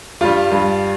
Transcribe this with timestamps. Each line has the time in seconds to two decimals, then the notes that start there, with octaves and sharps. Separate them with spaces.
0.21 G2 G3 F4
0.52 G2 G3